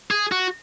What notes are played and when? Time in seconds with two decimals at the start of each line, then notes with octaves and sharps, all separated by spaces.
0.11 G#4
0.32 F#4